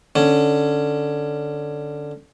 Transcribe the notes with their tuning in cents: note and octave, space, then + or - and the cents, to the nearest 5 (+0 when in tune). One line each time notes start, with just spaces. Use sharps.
D3 +5 C#4 +0